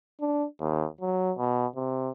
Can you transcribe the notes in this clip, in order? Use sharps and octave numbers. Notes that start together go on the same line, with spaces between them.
D4
D#2
F#3
B2
C3